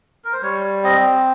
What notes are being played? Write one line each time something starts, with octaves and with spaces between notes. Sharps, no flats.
A#4
C5
G3 C#5
C4 D#5